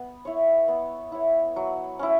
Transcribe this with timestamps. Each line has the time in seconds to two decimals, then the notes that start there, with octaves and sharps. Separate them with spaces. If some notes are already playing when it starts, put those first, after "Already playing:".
Already playing: B3
0.25 E4 C#5
0.68 B3
1.12 E4 C#5
1.56 F#3
1.99 C#4 E4